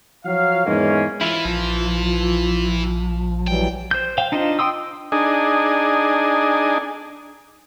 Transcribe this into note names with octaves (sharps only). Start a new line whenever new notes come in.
F3 F#3 F5
E2 G#2 E3 G#3 A#3 C#4
E3 E4 F4
A#1 F3 F4
E3 F#3 G3 G5
C5 G6
C5 F5 G5
D4 D#4 F4 C5 D#5
G5 C6 D#6 E6
D4 D#4 G#4